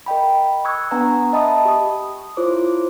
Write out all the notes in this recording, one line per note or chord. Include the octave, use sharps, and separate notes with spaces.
A#4 D#5 G5 B5
C#6 D#6 E6 F#6 G#6
B3 D4 B4 F#5 G#5 A#5
D#5 E5 A5 B5 D#6
G4 C#6 D#6
E4 F4 A#4 C5 C#5 D6